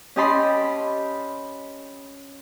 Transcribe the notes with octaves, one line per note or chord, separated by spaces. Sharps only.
C#4 G4 D#5 A5 B5 C6